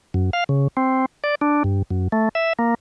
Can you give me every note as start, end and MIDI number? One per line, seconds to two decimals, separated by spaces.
0.14 0.30 42
0.33 0.44 77
0.49 0.68 49
0.77 1.06 60
1.24 1.35 74
1.41 1.63 62
1.64 1.82 43
1.90 2.08 42
2.12 2.29 57
2.35 2.53 76
2.59 2.74 58